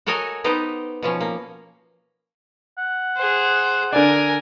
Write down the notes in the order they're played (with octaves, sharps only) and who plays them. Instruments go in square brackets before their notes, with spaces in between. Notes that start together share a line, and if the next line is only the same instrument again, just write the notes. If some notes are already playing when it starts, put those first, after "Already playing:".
[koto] F#4 A4 A#4 C#5 D#5 G#5
B3 D#4 G4 C5
B2 F3 C#4
A#3
[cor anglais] F#5
[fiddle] G#4 C5
[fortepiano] D3 D5 [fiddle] A#4 G#5